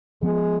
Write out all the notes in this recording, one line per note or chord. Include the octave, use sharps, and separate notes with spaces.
F3 G#3 B3